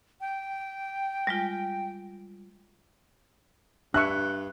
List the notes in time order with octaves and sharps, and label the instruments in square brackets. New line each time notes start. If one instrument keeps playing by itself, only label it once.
[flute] G5
[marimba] G3 G#3 F4
[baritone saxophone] G2 [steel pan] D4 E5 C#6 [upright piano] F#6